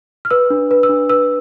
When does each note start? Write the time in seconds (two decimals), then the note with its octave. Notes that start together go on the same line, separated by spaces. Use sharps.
0.25 F6
0.31 B4 E6
0.50 D4
0.71 B4
0.83 E6
0.89 D4
1.09 B4 E6